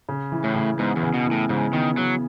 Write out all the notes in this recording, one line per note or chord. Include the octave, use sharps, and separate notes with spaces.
C#3
E3
A2
C#3
G#2 B3
E2
C#3
B2
E3
A2
G#2 C#3
D#3 B3
C#3 F#3